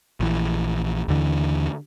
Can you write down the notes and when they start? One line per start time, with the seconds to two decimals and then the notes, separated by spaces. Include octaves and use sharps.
0.20 A#1 E3
1.08 D#2 D3 E3